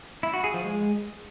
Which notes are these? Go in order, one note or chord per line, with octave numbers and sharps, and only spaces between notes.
E4
F#4
G#4
F3
G#3